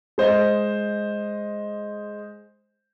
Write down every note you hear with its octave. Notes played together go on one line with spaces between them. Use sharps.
G#3 C5 D#5